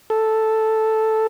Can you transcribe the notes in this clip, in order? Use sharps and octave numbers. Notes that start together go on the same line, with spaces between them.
A4